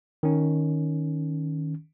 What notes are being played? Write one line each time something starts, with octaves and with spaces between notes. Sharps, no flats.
D#3 C#4